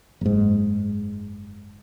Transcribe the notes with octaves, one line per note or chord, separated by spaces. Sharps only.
F#1 G#2